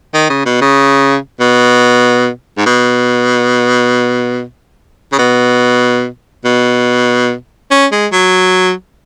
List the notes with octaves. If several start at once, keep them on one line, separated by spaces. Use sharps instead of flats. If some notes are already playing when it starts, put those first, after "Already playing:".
D#3
C#3
B2
C#3
B2
G#2
B2
C#3
B2
B2
C#4
G#3
F#3